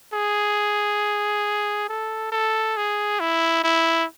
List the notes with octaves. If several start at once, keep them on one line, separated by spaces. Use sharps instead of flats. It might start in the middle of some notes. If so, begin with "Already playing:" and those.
G#4
A4
A4
G#4
E4
E4